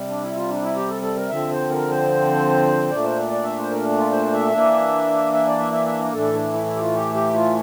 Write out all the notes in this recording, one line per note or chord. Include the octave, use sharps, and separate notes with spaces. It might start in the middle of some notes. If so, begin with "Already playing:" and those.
Already playing: C3 G3
D4
E4
F4
D4
E4
G4
A4
A4
A#4
D3 F3 C4 E5
C5
A#4
C5
A#2 A3 D4 D5
C5
D5
E5
C5
A#4
F4
C5
E5
E3 A#3 D4
E5
D5
E5
E5
E5
A#4
A2 E3 A3 D4 A4
D4
E4
E4
G4
F4
G4
G4
F4